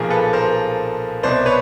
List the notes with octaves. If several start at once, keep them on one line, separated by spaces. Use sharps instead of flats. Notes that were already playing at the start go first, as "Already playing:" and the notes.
Already playing: B1 A#2 F3 G#4 A#4
A4 B4
A#4 C5
C2 B2 C5 D5
B4 C#5